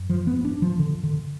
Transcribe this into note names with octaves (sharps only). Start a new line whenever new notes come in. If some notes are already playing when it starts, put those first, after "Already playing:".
Already playing: F#2
F3
B3
D4
F3
D3
D3